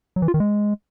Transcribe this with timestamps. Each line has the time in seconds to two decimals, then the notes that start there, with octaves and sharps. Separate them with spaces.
0.16 F#3
0.22 E3
0.28 F4
0.34 D#3
0.40 G#3